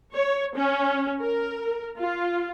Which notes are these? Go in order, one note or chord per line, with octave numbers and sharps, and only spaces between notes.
C#5
C#4
A#4
F4